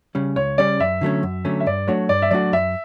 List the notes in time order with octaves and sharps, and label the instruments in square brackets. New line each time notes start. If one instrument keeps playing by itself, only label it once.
[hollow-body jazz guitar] C#3 G3 C#4
[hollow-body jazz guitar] C#2 [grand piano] C#5
[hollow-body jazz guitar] C#3 G3 C#4 [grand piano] D5
[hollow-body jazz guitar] F#2 [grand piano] E5
[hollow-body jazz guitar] D3 F#3 A3 C#4
F#2
D3 F#3 A3 C#4
[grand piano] E5
[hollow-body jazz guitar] G2 [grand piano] D5
[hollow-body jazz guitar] F#3 A3 D4 F#4 [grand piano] C#5
[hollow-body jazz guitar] G2 [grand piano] D5
[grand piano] E5
[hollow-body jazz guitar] F#3 A3 D4 F#4 [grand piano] D5
[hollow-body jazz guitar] F#2 [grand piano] E5